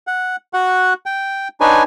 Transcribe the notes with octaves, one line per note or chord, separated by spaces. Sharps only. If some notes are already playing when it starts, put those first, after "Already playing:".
F#5
F#4 F#5
G5
D4 D#4 B4 C#5 G#5